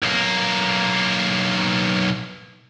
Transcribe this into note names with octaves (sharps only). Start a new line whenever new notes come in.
B1 A#3